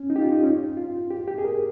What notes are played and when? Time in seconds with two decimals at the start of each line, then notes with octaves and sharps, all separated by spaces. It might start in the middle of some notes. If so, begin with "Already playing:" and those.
Already playing: C#4
0.10 D#4
0.16 G4
0.21 F4
0.32 D#4
0.43 C#4
0.77 F4
1.10 G4
1.27 G4
1.38 G#4
1.44 A#4